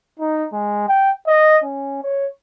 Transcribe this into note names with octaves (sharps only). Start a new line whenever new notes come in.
D#4
G#3
G5
D#5
C#4
C#5